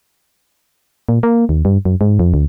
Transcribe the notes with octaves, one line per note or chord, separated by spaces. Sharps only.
A#2
A#3
D#2
G2
F#2
G#2
F2
D2